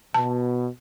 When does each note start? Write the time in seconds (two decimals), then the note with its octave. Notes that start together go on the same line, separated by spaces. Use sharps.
0.14 B2 A5